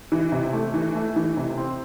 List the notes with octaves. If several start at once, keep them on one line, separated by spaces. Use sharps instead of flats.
E3
C3
A3
E3
A3
E3
C3
C4